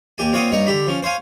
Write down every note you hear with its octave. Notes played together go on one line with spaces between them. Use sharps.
D#2 G4 G#5
A#2 C4 C#5 F5 F#5 D#6
G2 D#4 C#5
D3 G4 B5
F3 C#4
C5 C#5 F5 G#5